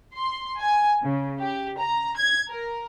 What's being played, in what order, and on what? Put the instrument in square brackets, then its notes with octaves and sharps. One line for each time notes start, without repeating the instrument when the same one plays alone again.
[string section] C6
G#5
C#3
G4
A#5
G#6
A#4